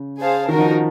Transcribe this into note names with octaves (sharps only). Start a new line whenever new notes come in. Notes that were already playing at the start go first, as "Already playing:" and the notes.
Already playing: C#3
G#4 C5 F5 A5
D#3 D#4 F#4 A#4
F3